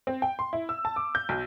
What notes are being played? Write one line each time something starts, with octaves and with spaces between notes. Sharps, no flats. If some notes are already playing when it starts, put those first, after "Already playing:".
C4
G5
C6
E4
E6
A5
D6
G6
B1